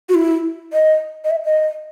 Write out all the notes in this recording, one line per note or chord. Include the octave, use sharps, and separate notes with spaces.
F#4
E4
D#5
D#5
E5
D#5